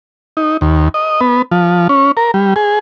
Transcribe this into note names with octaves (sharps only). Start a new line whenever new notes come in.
D#4
D#2
D#5
B3
F3
C#4
A#4
G3
G#4